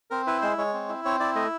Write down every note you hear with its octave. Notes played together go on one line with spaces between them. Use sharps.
C4 A#4
E4 B4
G#3 C5
G#3 C#5
C4
E4
C4 C#5
E4 D5
A3 D#5